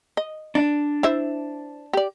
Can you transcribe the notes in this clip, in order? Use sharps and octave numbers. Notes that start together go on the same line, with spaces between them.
D#5
D4
E4 C5 E5
G4 D5